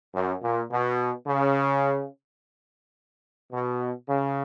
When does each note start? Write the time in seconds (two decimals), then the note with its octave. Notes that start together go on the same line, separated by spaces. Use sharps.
0.15 F#2
0.43 A#2
0.71 B2
1.27 C#3
3.52 B2
4.08 C#3